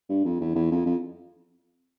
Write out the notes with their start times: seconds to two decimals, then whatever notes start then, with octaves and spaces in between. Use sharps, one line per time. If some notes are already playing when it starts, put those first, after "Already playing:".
0.10 G2
0.25 F2
0.41 E2
0.55 E2
0.71 F2
0.86 F2